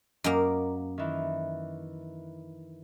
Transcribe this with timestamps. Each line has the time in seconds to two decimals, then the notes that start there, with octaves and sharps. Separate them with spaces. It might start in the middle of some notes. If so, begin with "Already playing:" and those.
0.24 F#2 A#3 D#5 D6
0.98 D#3 E3